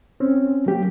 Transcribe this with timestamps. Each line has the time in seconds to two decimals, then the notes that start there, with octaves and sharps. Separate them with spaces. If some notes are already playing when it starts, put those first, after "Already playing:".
0.20 C4 C#4
0.66 F#3 A#3 G4